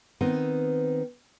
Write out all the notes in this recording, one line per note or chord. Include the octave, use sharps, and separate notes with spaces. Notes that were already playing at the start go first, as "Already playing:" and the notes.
D#3 B3 C4